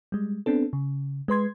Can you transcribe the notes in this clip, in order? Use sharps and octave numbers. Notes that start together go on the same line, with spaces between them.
G3 G#3
B3 C4 D4 A4
C#3
G#3 B4 C6 G#6